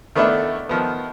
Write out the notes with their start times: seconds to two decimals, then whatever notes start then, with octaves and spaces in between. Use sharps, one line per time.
0.16 D#3 A3 B3 D4 E4 A4
0.69 D#3 F3 B3